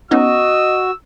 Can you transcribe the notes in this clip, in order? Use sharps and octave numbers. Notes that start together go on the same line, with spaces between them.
B3 C#4 D#4 F#4 D#5 E6